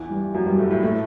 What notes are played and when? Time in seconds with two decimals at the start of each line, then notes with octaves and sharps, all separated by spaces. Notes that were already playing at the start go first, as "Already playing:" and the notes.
Already playing: E2 E3
0.10 G2 G3
0.34 F#2 F#3
0.46 G2 G3
0.58 A2 A3
0.71 A2 A3
0.83 A2 A3